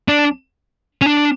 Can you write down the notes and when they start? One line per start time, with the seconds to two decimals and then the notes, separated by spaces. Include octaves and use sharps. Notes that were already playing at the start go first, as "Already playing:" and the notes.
0.08 D4
1.02 C#4
1.06 D4